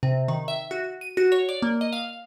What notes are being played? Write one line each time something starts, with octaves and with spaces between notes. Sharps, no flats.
C3
D#3
E5
F#4
D#7
F#4
C#5
D5
A#3
D#5
F5